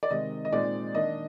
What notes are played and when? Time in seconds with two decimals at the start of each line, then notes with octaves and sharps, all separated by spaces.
0.03 D5
0.11 C3 D#3 G#3 C4 D#4 D#5
0.45 D#5
0.52 A#2 G#3 C4 D#4 D5
0.95 D#3 A#3 D4 D#5